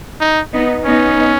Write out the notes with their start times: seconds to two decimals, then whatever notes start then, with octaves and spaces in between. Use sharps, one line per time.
0.21 D#4
0.53 B3 D#4
0.85 B3 C#4 D#4